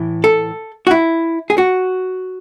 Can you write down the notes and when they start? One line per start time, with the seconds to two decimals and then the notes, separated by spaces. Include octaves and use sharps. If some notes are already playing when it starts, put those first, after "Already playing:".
Already playing: A2 E3
0.24 A4
0.87 F#4
0.91 E4
1.50 G#4
1.58 F#4